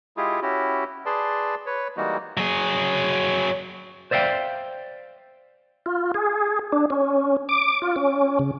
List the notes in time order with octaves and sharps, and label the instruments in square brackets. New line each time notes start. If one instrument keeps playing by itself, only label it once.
[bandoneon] G#3 E4 F4 G4 G#4
C#4 E4 F#4 G4
G#4 B4 D5 A5 C6
B4 C#5
E3 G3 G#3 A#3 D#4 F#4
[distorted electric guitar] F#3 G#4
[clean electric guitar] C5 D5 E5 F5 G5
[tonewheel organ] F4
G#4
D4
C#4
D6
F4
C#4
C#3